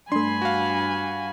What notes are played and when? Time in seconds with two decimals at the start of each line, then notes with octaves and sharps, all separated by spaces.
0.12 G2 A3 D4 G#5 B5 C6
0.42 F#4 F5